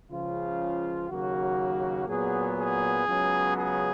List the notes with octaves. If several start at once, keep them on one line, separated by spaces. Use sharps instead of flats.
C#2 C#3 F3 F4
D#2 C#3 F#3 A#3 F#4
A#2 F#3 B3 G#4
G#4
C#2 C#3 F#3 B3
G#4